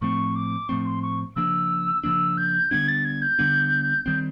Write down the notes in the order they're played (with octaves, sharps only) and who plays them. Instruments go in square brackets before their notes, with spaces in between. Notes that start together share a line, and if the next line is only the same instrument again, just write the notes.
[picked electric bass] A2 F3 A3 C4 [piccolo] C#6
[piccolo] D6
[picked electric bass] A2 F3 A3 C4 [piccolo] C#6
[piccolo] C6
C#6
[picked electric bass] C#3 F3 A#3 D4 [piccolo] E6
[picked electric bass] C#3 F3 A#3 D4 [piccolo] E6
[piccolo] G6
[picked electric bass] D3 G3 B3 D4 [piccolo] G#6
[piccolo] A6
G#6
G6
[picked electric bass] D3 G3 B3 D4
[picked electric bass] D#3 G3 C4 [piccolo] G6